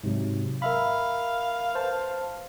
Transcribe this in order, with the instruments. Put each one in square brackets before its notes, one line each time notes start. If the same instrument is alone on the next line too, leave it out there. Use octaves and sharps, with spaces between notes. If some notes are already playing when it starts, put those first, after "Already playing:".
[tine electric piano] G#2 C3 F#3
[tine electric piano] A#4 E5 B5 [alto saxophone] F5
[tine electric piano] B4 C5 A5